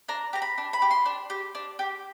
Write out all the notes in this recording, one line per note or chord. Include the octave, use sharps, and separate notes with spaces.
D4 A#5
G4 A#5
B5
D4
B5
G4
C6
D4
G4
D4
G4